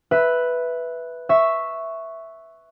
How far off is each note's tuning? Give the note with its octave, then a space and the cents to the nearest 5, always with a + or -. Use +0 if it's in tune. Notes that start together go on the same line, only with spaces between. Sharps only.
B4 +0 E5 +0
E5 +0 C#6 +0